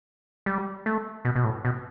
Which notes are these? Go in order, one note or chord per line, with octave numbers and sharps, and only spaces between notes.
G3
A3
B2
B2
A2
B2